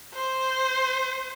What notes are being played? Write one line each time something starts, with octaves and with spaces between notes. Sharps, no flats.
C5